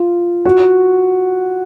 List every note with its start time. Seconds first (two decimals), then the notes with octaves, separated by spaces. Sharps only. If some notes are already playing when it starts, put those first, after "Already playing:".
Already playing: F4
0.45 F#4